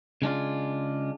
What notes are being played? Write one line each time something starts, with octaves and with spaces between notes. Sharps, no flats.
C#3 G#3 D4 F4